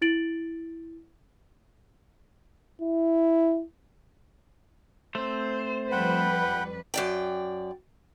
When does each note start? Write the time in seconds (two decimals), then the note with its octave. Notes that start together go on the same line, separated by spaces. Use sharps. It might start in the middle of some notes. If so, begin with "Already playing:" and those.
0.01 E4 A6 D7 F#7
2.81 E4
5.15 A3 C4 C5
5.92 F2 G3 B4 F#5 G5 B5
6.94 F#2 D5 G5